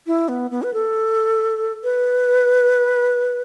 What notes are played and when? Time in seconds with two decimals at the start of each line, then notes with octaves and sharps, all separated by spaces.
0.07 E4
0.29 B3
0.51 B3
0.63 B4
0.74 A4
1.84 B4